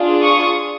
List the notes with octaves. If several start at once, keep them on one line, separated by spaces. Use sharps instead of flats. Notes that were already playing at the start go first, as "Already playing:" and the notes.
Already playing: D4 F4 G#4
C#6 D#6